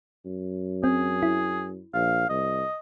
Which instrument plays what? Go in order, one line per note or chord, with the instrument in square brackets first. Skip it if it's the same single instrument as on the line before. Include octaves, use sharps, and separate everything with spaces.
[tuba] F#2
[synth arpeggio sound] C4 [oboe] G#4
[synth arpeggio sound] E4
[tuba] A#1 [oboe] F5
[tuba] C2 [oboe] D#5